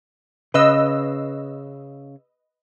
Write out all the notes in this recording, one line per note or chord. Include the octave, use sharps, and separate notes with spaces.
C#3 B4 D#5 E6